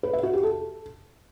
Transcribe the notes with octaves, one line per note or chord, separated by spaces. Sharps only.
B4
E5
F#4
G4
A4